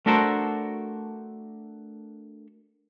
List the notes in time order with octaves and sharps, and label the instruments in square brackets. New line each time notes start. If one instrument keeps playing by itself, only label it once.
[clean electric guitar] A3 D4 F#4 A4 A#4 C5